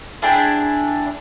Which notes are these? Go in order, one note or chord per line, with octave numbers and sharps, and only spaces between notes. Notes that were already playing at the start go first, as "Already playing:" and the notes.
D4 E4 G#4 G5